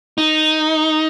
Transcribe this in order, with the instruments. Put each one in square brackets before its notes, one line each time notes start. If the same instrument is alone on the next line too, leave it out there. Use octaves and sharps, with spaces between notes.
[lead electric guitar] D#4